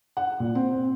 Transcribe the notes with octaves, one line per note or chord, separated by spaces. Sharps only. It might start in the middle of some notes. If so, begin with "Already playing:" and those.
F#5
A#2
C4